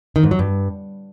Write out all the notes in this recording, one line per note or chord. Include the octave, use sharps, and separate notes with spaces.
D#3
G#2
F#3
G2